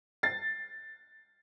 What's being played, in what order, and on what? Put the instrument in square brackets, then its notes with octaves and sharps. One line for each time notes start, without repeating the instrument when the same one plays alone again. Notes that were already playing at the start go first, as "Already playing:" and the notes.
[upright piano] A6 C7